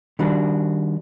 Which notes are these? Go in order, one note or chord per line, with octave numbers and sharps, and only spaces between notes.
D#3 G3 D4 F#4